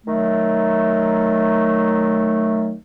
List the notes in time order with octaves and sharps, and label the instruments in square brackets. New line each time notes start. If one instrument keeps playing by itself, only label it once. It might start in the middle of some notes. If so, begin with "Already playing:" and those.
[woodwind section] D#3 F#3 A3